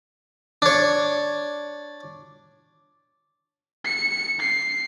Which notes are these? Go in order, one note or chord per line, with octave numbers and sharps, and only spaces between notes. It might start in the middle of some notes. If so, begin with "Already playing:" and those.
D4 C#5
C#7
C7